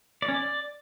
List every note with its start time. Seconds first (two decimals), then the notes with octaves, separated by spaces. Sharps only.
0.22 D5
0.28 C#4
0.34 D5